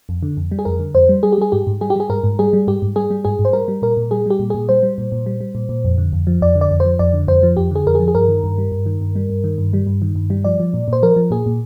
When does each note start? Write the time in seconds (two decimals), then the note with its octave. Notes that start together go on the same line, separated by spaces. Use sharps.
0.09 F2
0.23 D3
0.37 F2
0.52 G3
0.59 G#4
0.65 F2 A#4
0.80 D3
0.95 F2 C5
1.09 G3
1.23 G3 G#4
1.32 G4
1.38 G3 G#4
1.52 G#2 G4
1.67 G#2
1.81 G3 G#4
1.90 G4
1.96 G3 G#4
2.10 G#2 A#4
2.24 G#2
2.39 G3 G#4
2.53 G3
2.67 G#2 G4
2.82 G#2
2.96 G3 G#4
3.10 G3
3.25 G#2 G#4
3.39 G#2
3.45 C5
3.53 G3 A#4
3.68 G3
3.82 A#2 A#4
3.97 A#2
4.11 G3 G#4
4.26 G3 G4
4.40 A#2
4.50 A#2 G#4
4.69 G3 C5
4.83 G3
4.98 A#2
5.12 A#2
5.26 G3
5.41 G3
5.55 A#2
5.69 A#2
5.85 F2
5.98 D3
6.13 F2
6.27 F3
6.42 F2 D5
6.55 D3
6.61 D5
6.71 F2
6.80 C5
6.85 F3
6.99 F2 D5
7.13 D3
7.28 F2 C5
7.43 F3
7.57 F2 G4
7.71 D3 G#4
7.86 F2 A#4
7.95 G#4
8.00 F3
8.08 G#4
8.15 G2 A#4
8.28 D#3
8.44 G2
8.58 G3
8.72 G2
8.86 D#3
9.01 G2
9.16 G3
9.30 G2
9.44 D#3
9.58 G2
9.73 G3
9.87 G2
10.02 D#3
10.15 G2
10.30 G3
10.44 F3 D5
10.60 F3
10.74 A#2
10.88 A#2 C5
11.03 F3 A#4
11.16 F3
11.31 A#2 G#4
11.46 A#2